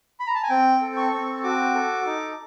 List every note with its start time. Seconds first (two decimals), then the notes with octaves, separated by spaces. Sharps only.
0.20 B5
0.27 A#5
0.35 A5
0.43 G#5
0.50 C4 G5
0.81 A4
0.97 C#6
1.13 C4
1.43 F#4 D6
1.75 A4
2.06 D#4